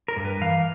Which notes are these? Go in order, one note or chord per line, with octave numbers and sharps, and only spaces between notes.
A#4
G2
B4
E3 F5